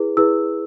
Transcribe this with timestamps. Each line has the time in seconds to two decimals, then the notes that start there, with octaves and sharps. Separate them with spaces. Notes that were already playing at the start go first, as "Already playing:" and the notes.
Already playing: E4 G#4 B4
0.17 E4 G#4 B4 E6